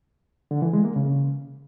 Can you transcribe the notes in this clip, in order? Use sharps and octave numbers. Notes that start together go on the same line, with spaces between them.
D3
E3
G#3
A#3
C#3